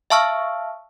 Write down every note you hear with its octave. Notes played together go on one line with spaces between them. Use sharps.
E5 F5 A5 C#6 E6 F6